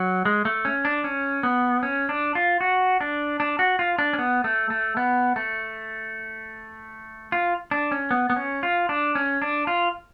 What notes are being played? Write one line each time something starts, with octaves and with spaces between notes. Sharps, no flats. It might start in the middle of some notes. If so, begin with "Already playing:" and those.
Already playing: F#3
G#3
A3
C#4
D4
C#4
B3
C#4
D4
F4
F#4
D4
D4
F#4
F4
D4
C#4
B3
A3
A3
B3
A3
F4
D4
C#4
B3
B3
C#4
F4
D4
C#4
D4
F4